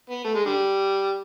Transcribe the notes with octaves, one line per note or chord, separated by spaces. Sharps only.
B3
A3
G#3
D3 G3